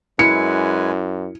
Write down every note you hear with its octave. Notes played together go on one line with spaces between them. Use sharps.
F#2 G#3 E4 B4 G#5 C#7